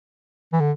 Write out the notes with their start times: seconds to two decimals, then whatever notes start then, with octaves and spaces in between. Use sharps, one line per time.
0.53 E3
0.60 D3